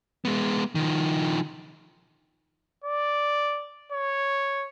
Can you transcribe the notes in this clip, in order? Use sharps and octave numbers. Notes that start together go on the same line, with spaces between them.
G#3 B3
D#3 F3
D5
C#5